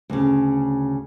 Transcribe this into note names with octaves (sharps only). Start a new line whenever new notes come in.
D2 C#3